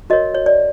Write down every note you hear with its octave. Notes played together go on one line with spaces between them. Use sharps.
F#4 A#4 C#5 D#5
C#5
D5